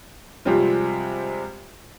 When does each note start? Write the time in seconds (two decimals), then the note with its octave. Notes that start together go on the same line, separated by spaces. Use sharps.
0.45 C3 F3 G3 G#3 C4 F4